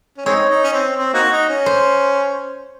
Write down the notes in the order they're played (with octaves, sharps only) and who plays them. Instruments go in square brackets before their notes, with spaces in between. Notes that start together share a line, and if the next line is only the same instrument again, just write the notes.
[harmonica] C#4
[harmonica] G#3 C4 D#4 [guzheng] C#5
[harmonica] D#4
C#4
C4
C4
A#3 D#4 F#4
D#4
C#4
[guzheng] C5